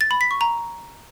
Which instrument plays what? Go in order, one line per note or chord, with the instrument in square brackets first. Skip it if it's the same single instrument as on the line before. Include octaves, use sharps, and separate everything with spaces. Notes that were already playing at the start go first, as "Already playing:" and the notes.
[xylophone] A6
B5
B6
C#6
A#5